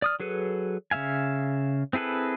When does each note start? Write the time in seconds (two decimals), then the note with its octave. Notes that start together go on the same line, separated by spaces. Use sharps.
0.02 D5 D#6 F6
0.20 F#3 G#4 A4 B4
0.91 C#3 A3 E5 F5 G#5
1.93 C4 E4 G#4 A4 B4